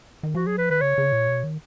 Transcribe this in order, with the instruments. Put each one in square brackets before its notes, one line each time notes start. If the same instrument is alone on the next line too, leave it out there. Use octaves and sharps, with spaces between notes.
[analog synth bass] D#3
[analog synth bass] F3 [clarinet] F#4
[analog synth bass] F#3 [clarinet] G#4
[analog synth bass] F3 [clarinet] B4
[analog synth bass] D#3 [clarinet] B4
[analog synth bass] C#3 [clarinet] C#5
[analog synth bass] C#3
A#2
B2
D#3